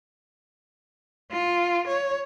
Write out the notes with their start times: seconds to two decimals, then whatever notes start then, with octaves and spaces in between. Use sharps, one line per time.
1.32 F4
1.88 C#5